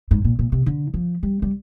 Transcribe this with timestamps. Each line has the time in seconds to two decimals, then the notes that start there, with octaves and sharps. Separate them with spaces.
0.11 G#2
0.25 A#2
0.39 A#2
0.52 C3
0.66 D3
0.94 F3
1.23 G3
1.42 G3